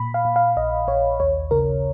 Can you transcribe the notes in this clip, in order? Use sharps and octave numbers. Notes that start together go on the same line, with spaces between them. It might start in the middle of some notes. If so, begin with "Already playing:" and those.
Already playing: A#2 B5
F5
A#2
F5
A#1 D#5
A#1 C#5
D#2 C#5
C#3 A#4